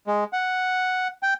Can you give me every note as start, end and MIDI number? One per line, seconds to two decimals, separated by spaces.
0.07 0.24 56
0.33 1.08 78
1.23 1.34 79